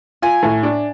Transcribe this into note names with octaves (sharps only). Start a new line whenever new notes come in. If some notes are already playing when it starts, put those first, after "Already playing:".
F4 G#5
A2
D4